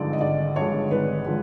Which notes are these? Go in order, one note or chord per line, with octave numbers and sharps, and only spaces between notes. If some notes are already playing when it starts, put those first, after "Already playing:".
Already playing: G#1 G2 D3 F3 G#3 D5
D#5
G#1 D5
G2 D3 F3 G#3 C#5
G#1 B4
D3 F3 G#3